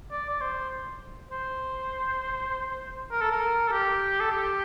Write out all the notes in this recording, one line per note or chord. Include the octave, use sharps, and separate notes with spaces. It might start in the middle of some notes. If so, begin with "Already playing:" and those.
D5
D5
C5
C5
A#4
A4
A#4
A4
G4
A4
G4